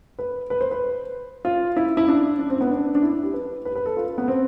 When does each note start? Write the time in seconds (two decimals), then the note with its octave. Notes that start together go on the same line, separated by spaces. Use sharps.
0.19 B4
0.50 B4
0.61 C5
0.71 B4
1.45 F4
1.77 E4
1.97 E4
2.08 D4
2.39 D4
2.50 C4
2.61 B3
2.71 D4
2.95 D4
3.03 E4
3.23 G4
3.33 B4
3.65 B4
3.76 B4
3.86 A4
3.97 F4
4.18 B3
4.28 C4